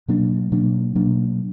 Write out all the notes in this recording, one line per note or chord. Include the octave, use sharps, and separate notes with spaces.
B2 F#3 A#3 D4
B2 F#3 A#3 D4
B2 F#3 A#3 D4